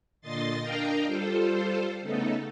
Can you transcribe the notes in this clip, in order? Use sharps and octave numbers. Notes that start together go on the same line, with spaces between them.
A#2 D3 D#5 C6 A6
D4 A#4 D#5 F5 G5 A#5
G3 F4 A4 C5
C#3 A3 B3 D#4 A4